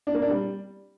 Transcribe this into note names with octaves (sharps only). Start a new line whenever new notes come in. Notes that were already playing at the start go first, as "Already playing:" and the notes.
D4
A#3
D4
G3